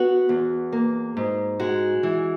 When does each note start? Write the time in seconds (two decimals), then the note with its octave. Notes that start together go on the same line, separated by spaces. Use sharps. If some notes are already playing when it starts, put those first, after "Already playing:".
Already playing: B3 F#4
0.29 E2
0.72 A#3
1.17 G#2
1.60 G#3 F#4
2.03 E3